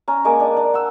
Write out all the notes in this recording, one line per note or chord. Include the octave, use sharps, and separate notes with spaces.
C#4 A#5
G#3 A#3 G#5 D6
D4
D4
F#5 E6